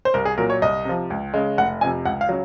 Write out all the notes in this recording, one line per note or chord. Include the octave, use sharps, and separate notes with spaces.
C5
C2 A#4
G#4
A#2 F#3 A#4
C#5
C2 D#5
C3 F3
C#2
C#3 G#3
F1 F#5
F2 C3 G#5
C#2 F#5
F5
C#3 F#3